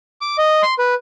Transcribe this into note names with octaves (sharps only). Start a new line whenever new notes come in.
D6
D#5
C6
B4